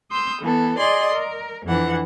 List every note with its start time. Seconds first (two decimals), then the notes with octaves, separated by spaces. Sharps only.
0.10 C6 D#6 E6 G6
0.42 E3 B3 A4
0.77 G#4 D5 D#5 C6
1.13 A#4
1.65 F2 E3 D4 F#5